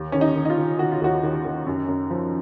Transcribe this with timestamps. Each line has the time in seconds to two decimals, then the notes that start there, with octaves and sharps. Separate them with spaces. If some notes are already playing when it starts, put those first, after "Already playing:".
Already playing: D#2
0.12 D#3 C#4
0.21 D#4
0.36 D#3
0.45 D#4
0.50 F4
0.58 D#3
0.79 D#3 F#4
0.92 F4
1.02 D#2 F#4
1.23 D#3
1.45 D#3
1.67 F#2
1.88 F#2
2.10 F3